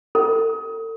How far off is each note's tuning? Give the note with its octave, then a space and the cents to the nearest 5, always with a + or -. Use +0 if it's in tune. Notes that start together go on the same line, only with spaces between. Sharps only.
A4 +40